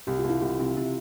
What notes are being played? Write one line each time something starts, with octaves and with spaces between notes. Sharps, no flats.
C2 G4
F4
C2
E4
C2
C3
C3